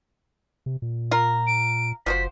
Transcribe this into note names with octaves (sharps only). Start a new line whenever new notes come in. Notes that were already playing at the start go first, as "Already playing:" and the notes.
C3
A#2
F4 A#4
D7
F#1 F3 F#4 C5 B6